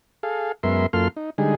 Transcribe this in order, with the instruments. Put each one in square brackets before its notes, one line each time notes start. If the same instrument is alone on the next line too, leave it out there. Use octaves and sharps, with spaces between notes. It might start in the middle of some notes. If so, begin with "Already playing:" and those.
[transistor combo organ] G#4 A4 F5
F#2 G#3 B3 A#4 E5 C6
F#2 A#3 F4 A4 C6 F6
D#4
D3 G3 G#3 D#4 G#4